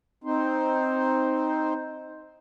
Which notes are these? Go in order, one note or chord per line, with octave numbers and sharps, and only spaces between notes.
C4 D#4 C5